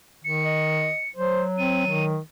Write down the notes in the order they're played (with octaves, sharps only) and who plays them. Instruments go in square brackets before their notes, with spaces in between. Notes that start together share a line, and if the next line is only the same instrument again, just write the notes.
[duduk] D#3 [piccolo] C#7
[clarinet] D#5
[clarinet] F#3 [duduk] C5
[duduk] C4 [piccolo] D#7
[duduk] D#3